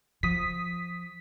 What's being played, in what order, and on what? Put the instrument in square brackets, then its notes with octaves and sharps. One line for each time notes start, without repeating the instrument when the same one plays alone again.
[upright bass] F3 [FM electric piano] D#6 B6